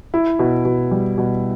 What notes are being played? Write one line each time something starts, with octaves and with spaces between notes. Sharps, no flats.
E4
B2
B2
G3
B2